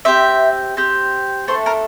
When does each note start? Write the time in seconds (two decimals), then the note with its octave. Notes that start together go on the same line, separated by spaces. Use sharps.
0.05 C4 G4 E5
0.77 C4 G4
1.48 A3 D4 A4 C5
1.66 A#4